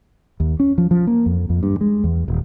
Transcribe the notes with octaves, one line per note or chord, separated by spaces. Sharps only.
D#2
C#4
F3
F3
A#3
F2
F2
G2
G#3
E2
D#1